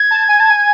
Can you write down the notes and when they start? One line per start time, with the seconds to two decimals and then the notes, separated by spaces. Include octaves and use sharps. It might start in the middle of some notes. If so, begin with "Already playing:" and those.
Already playing: G#6
0.11 A5
0.29 G#5
0.40 A5
0.50 G#5